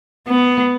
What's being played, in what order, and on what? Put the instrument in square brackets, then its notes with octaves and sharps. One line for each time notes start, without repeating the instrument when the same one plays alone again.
[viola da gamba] B3